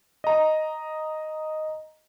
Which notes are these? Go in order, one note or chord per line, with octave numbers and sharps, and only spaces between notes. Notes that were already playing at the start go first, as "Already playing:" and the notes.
D#5 A#5